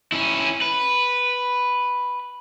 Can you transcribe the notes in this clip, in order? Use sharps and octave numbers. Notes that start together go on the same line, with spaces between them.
C#4 E4
B4